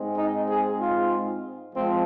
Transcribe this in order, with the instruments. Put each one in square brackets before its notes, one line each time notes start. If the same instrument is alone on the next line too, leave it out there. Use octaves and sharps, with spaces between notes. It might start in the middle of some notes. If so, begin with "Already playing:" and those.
Already playing: [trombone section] G#2 G#3 C4
D#4
G#4
F4
F3 G#3 C4